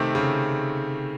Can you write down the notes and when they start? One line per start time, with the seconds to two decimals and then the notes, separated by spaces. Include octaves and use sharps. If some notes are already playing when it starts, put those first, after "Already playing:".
Already playing: C3 D#3 A3 C4
0.15 C#3